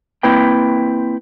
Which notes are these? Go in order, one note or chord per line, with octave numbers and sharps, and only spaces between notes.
A#3 C4 E4 B4 G5